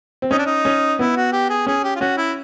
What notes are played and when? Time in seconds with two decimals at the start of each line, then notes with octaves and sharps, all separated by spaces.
0.22 C4
0.31 C#4 D#4
0.39 D4
0.46 D#4
0.65 C#4
0.99 B3 E4
1.16 F#4
1.33 G4
1.49 G#4
1.67 C#4 G#4
1.84 G4
1.96 F4
2.01 C#4 F#4
2.17 E4